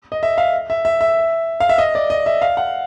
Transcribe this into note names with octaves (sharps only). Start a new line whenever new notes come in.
D#5
E5
F5
E5
E5
E5
F5
E5
D#5
D5
D#5
E5
F5
F#5